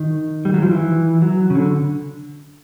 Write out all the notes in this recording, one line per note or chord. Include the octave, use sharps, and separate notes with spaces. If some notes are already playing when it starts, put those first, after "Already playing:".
Already playing: D#3
G3
F#3
F3
E3
F#3
C#3
D3